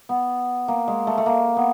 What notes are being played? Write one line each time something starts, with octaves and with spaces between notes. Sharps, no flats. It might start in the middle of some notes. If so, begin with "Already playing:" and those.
B3
A#3
G#3
A3
A3
A#3
B3